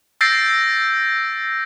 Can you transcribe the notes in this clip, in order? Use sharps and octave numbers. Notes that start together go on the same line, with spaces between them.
E6 G6 A6 A#6 C7 D7